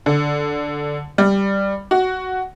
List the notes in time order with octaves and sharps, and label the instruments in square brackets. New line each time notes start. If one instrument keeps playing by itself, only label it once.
[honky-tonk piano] D3
G3
F#4